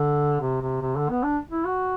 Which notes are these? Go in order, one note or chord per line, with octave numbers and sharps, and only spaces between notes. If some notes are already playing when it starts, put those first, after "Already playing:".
Already playing: D3
C3
C3
C3
D3
B3
D4
E4
F#4